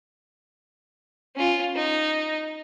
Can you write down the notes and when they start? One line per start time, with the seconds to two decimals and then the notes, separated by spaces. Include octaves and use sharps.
1.36 C#4 F4
1.75 D#4